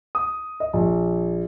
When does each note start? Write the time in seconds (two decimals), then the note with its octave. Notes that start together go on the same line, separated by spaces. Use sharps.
0.15 D#6
0.60 D#5
0.73 A#1